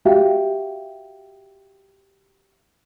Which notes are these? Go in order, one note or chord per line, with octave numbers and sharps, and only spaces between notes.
F#4 G4 E5 F5